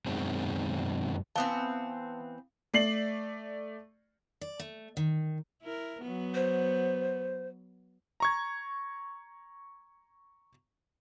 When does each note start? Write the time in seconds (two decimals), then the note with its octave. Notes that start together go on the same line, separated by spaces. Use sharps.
0.06 F#2 B2 D#3 G#3 C4
1.36 E3 B3 C4 F5 A5
2.74 A3 D5 C7 F#7
4.41 D5
4.60 A3
4.97 D#3
5.63 E4 A#4
6.01 F#3 B3
6.34 C5
8.20 A#5 C#6 G#6